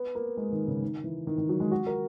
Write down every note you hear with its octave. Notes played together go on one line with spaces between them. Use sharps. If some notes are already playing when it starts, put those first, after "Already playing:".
Already playing: B3
A#3
G#3
D#3
C#3
D#3
E3
D#3
D#3
F#3
G#3
F#4
A#4